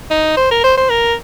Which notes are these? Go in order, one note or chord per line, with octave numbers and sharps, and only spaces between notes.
D#4
C5
A#4
C5
C5
A#4